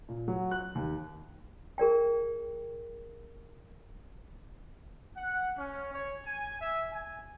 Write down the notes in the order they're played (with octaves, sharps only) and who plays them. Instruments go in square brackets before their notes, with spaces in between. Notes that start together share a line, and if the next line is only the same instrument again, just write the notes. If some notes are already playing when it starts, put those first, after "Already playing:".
[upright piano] A#2
F#3
F#6
D#2
[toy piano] G#4 A#4 D5 G5
[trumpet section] F#5
C#4
C#5
G#5
E5
G#5